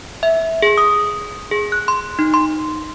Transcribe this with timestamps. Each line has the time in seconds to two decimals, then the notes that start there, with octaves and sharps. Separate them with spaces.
0.23 E5
0.62 G#4
0.78 D#6
1.51 G#4
1.72 F#6
1.88 C6
2.19 D#4
2.34 C6